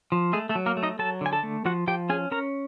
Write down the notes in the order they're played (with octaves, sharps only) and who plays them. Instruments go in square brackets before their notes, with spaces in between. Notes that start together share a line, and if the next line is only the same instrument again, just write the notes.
[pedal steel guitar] F3
G#3 A3 G#4
A3 A4
F#3
A#3 A#4
A3
D#4 D#5
F#3 A4 A5
D3 G#5
A4 A5
A3
F3 F#4 F#5
F3 G4 G5
C#4 G#4 G#5
C#4 A#4 A#5